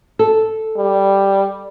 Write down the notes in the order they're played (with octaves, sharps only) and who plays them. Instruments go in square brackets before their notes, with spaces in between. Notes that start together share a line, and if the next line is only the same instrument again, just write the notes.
[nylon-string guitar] A4
[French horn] G3